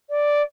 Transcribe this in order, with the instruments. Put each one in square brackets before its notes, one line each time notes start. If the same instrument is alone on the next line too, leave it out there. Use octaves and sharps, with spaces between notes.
[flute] D5